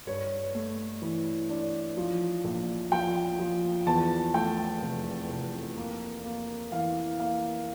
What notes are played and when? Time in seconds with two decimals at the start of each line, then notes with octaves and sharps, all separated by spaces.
0.07 G2 C#5
0.54 A3
1.02 E3
1.49 D4
1.97 F3
2.44 A#1
2.92 F3 G5
3.39 F3
3.86 E2 A5
4.34 A3 G5
4.82 F1
5.30 F1
5.77 A#3
6.24 A#3
6.72 E3 F5
7.19 A#3 F5